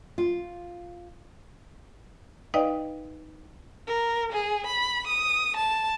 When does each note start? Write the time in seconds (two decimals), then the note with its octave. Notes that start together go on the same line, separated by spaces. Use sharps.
0.18 F4
2.54 D#4 B4 D5 D#5 F5 G5
3.87 A#4
4.32 G#4
4.66 B5
5.07 D#6
5.56 A5